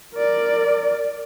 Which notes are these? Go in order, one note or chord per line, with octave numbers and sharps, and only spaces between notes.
A#4 D5